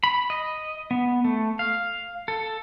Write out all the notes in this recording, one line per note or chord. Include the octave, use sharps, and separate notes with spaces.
B5
D#5
B3
A3
F5
A4